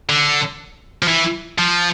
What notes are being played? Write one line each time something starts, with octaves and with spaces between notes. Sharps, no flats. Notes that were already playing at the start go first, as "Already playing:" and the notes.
D3
F3
E3
F3